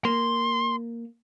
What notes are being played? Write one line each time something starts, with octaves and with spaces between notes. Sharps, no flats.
A#3 C6